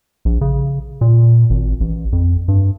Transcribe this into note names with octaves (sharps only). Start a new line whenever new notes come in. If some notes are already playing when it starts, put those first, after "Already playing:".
A#1
C#3
A#2
G#1
A1
F2
G2